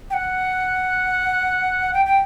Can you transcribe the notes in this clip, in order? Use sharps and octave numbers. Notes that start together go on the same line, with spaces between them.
G5
F#5
G5
G5